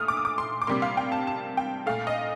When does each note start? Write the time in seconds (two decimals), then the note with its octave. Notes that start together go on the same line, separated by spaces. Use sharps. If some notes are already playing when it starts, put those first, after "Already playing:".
Already playing: A#2 A3 D#6 F6
0.08 D6
0.17 D#6
0.25 D6
0.38 C6
0.62 D6
0.67 C3 G3 A#3 C6
0.82 F5
0.97 G5
1.12 A5
1.27 A5
1.57 G5
1.86 A#2 A3 F5
2.07 D#5